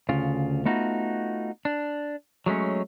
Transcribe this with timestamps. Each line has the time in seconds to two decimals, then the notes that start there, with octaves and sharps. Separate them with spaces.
0.09 D2 C#3 F4
0.65 A3 B3 D#4 F4 F#4
1.65 D4
2.46 F#3 G#3 A3 C#4